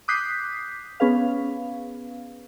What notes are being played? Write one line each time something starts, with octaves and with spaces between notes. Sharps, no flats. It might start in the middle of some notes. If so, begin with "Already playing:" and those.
D6 D#6 F#6 G6 B6 C7
B3 C#4 G#4 B4 F5